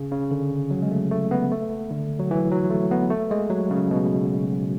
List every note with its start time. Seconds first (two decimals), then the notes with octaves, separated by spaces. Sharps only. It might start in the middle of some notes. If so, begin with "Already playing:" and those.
Already playing: C#3
0.11 C#3
0.31 D3
0.71 F#3
0.82 G#3
0.91 A3
1.11 A3
1.31 B3
1.51 A3
1.90 D3
2.20 F#3
2.31 E3
2.51 F#3
2.70 A3
2.91 B3
3.10 A3
3.31 G#3
3.50 F#3
3.71 C#3
3.91 B2